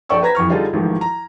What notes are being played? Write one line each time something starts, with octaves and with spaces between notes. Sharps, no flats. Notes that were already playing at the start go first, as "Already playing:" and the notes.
A#1 A4 D5 G5 C#6 E6
B4 C5 A#5 G#6 A#6 B6
F2 E3 C#6 F6
D3 G3 D#4 F4 G#4 A4
A1 G#2 D#3 F3
A#5